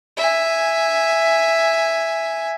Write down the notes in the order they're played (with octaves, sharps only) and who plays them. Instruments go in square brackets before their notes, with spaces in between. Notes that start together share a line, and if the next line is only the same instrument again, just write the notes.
[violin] E5 G#5